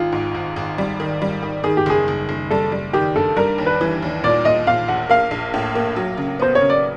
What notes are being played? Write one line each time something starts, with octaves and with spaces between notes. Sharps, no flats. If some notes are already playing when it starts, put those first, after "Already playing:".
Already playing: G#1 F4
G#2
G#1
G#1
G3
D#3
G3
D#3
D#3 G#4
G4
F#1 G#4
F#1
F#1
G3 A4
G3
D#3 G4
G2 A4
G3 A#4
D#2
B4
E3
D#2
A#2 D5
A#2 D#5
A#2 F5
A#1 F#5
A#3 F5
A#1
A2
A#3
F#3
C#3
B3 C5
C#5
C#3
D5